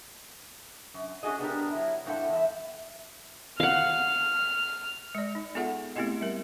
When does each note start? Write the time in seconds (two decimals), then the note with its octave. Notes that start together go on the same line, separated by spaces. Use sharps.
0.94 F#2
1.23 C#4 D4 F#4 G#4 D#5
1.39 B3 D4 G4 A#4
1.71 F#3 E4
2.06 G2 C4 E4 A4 F#5
2.29 E2 E5
3.60 F5 F#5 F6
5.15 G#3 D5
5.35 D#4
5.55 B3 F4 G#4 A4 E5 F#5
5.96 A3 B3 C4 E4 G4 D#5
6.21 G3 A#4